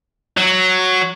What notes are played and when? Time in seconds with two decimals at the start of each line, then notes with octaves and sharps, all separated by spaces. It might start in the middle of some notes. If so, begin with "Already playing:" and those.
0.37 F#3